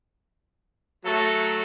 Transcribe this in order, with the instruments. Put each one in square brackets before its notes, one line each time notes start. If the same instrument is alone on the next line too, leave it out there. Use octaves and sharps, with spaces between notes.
[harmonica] F#3 [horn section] A3 A4